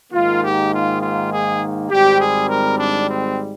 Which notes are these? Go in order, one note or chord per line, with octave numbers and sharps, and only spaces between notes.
G#2 D#3 A#3 F4
G4
F4
F4
G#4
G#1 G#2 G3 C4 G4
G#4
A#4
D4
C4